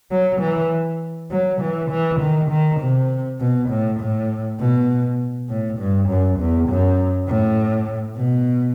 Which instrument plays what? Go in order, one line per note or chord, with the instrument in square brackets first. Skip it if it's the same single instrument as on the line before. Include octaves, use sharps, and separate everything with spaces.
[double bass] F#3
E3
F#3
E3
E3
D#3
D#3
C3
B2
A2
A2
B2
A2
G2
F#2
E2
F#2
A2
B2